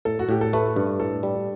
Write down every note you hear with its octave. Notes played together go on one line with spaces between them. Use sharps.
A2 A4
F#4
A2 G4
A4
A3 B4
G2
A2 A4
G3